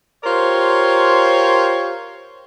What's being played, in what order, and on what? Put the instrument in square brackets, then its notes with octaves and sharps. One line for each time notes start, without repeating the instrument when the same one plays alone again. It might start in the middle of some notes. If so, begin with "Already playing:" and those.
[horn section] F4 G4 A#4 C5 C#5